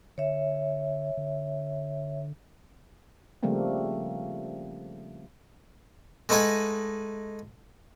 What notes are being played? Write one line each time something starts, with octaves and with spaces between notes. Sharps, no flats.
D3 C#5 E5
D3
C#3 F3 G3 A3 A#3 C4
G#3 A3 D#4 B4 F#5 G#5